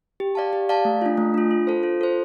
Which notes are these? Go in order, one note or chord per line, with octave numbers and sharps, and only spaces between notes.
G4
D5 F5 A5
G4
D5 F5 A5
A3
D4 F4
A3
D4 F4
F4
A4 C5
F4
A4 C5